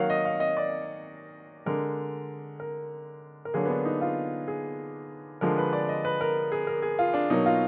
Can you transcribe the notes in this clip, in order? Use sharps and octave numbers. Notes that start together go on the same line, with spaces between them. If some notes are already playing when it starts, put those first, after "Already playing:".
Already playing: D#3 F#3 A#3 F5 F#5
D#5
F5
D#5
D5
D3 G#3 A#4
A#4
A#4
D3 F#3 A#3 G#4
B3
D4
D#4
F4
G#4
D3 F3 G#3 A#4
B4
D5
D#5
B4
A#4
G#4
A#4
G#4
F4
D4
B2 F#3 A#3 D#4
F4